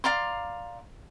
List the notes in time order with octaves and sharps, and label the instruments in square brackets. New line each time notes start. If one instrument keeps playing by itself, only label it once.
[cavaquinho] D5 F5 A#5 C6